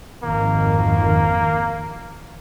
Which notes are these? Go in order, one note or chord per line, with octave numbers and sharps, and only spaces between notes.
G#1 F2 D#3 A#3